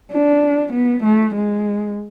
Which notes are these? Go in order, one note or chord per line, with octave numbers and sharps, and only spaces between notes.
D4
B3
A3
G#3